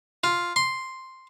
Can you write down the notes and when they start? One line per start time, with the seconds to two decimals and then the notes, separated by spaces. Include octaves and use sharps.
0.24 F4
0.56 C6